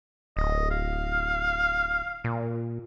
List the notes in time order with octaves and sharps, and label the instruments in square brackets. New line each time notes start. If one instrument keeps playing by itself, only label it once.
[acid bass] D1 [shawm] D#5
[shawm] F5
[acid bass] A#2